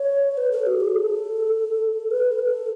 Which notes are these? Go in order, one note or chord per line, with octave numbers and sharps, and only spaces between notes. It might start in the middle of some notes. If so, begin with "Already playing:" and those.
Already playing: C#5
B4
A4
F#4
G#4
A4
B4
A4